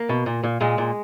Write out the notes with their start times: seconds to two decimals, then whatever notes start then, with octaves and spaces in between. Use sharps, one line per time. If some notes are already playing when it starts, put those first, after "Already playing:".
Already playing: A#3
0.09 B2
0.26 A#2
0.44 A#2
0.61 A#2 G#3
0.78 A#2